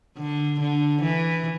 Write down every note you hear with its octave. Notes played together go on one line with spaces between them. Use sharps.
D3
D3
E3